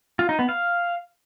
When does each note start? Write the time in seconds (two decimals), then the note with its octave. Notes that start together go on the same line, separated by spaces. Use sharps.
0.19 F4
0.29 D#4
0.39 B3
0.49 F5